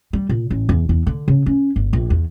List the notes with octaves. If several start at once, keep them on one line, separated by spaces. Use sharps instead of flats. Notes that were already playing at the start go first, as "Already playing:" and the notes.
G3
A#2
A1
E2
E2
D3
C#3
C#4
G1
A#1
E2